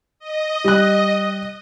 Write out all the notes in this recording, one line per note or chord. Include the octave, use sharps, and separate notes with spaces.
D#5
G3 F#6